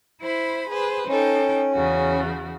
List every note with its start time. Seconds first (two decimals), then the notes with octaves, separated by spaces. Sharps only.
0.22 E4 C5 B5
0.70 G#4 B4 C5
1.08 C#4 D#4 A4 G5
1.74 E2 C#3 F#4